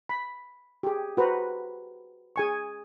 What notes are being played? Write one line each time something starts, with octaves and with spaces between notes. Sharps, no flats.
B5
G4 G#4
F#4 B4 C5 A#5
G#4 G#5 C#6